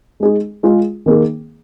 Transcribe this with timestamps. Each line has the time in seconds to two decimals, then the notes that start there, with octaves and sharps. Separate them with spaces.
0.20 G#3 D#4 G#4
0.63 G#3 F4 G#4
1.06 D#3 A#3 G#4